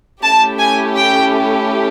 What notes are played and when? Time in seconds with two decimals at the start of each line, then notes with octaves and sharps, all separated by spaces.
0.22 A3 C#4 E4 G4 A5
0.60 G#5
0.96 G5